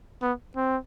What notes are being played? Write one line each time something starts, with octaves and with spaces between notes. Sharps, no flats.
B3
C4